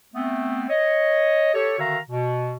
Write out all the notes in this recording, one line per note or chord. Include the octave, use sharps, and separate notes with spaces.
A3 B3 C4
C#5 D#5
G4 A4 C#5
D3 D#3 F#4 E5 F5 A#5
B2